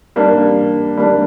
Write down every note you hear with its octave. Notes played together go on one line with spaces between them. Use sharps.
G3 A#3 D4
G3 A#3 D4